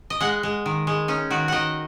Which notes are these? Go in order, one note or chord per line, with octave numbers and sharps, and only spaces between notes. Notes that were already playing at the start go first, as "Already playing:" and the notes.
D#5
G#3 F#5
G#3
D#3
G#3
C#4 D#4
D#3 F#4
D#3 D#5 F#5